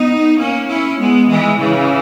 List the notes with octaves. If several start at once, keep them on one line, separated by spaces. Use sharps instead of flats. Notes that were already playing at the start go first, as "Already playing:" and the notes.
Already playing: B3 D#4
A#3 C#4
C#4 E4
G#3 B3
E3 G#3
C#3 E3